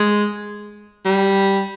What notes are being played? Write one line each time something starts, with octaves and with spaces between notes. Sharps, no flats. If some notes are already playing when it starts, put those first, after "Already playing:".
Already playing: G#3
G3